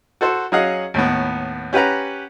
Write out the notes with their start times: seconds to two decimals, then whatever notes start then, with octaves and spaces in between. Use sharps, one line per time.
0.21 F#4 A4 C5
0.52 F#3 C#4 G#4 D#5 F5 F#5
0.94 D#2 A2 B3
1.73 C#4 G4 B4 F#5 A#5